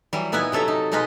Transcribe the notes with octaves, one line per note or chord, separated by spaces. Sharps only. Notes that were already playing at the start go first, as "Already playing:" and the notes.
E3 F#3 G3
A#2 B3 D#4 E4 B4 G#5
C3 F#3 A4 E5 A#5
D#4
B2 G#3 D#4 F4 B4 D#5